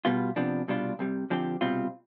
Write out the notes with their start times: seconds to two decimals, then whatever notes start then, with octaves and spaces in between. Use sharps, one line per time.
0.05 B2 G3 B3 F4
0.36 C3 F3 B3 D4
0.68 C2 B2 G3 D4 F4
0.99 C2 C3 G3
1.30 D3 F3 C4 G4
1.61 C2 B2 G3 C4 F4